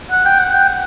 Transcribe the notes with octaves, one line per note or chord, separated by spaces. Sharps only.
F#5
G5
F#5
G5
F#5